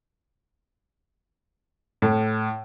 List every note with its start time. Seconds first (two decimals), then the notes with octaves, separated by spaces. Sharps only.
2.02 A2